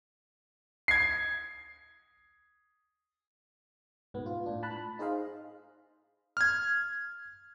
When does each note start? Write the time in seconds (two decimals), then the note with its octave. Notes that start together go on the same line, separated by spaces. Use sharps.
0.88 G#6 C7
4.14 G#2 B2 B3
4.26 F4
4.44 A2 D4 F4
4.63 A5 B5 F#6
4.76 B5
4.99 D#4 G#4 C5 D#5 F5
6.37 F6 G#6